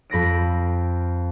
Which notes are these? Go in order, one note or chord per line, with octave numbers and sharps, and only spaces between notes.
F2 B5 A#6 D7